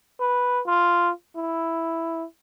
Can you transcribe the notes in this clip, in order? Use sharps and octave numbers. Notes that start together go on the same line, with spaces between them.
B4
F4
E4